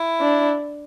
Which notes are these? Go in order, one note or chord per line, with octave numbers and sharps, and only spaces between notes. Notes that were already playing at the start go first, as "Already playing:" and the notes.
Already playing: E4
D4